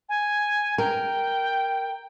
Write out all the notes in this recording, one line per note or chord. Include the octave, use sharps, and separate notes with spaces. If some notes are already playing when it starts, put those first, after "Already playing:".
G#5
A#4 G5